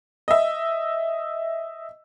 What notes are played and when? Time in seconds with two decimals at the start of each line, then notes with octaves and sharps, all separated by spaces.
0.28 D#5 E5